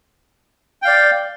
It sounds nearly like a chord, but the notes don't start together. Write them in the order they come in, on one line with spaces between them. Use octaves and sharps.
G5 F5 D5